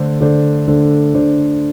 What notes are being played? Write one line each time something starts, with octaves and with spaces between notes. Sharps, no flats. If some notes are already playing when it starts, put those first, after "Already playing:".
Already playing: D3 A3 D4 C5
D3 A3 D4 C5
D3 A3 D4 C5
D3 A3 D4 C5